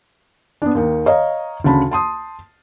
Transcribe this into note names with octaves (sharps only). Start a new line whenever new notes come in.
B3 D4
D#2 D#3
C#5 D#5 F5 A#5
D2 C#3 A5 B5
A5 C6 D#6